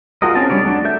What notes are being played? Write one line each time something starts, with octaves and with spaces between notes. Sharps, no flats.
F4 F#4 G#4 A#4 D#5
C4 C#4 G#4 D#5 A5
G3 D4 C#5 D5
F#3 A3 D4
A4 E5 G6